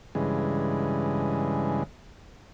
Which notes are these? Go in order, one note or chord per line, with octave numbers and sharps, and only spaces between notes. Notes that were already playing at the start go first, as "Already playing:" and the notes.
G2 C#3 E3 G#3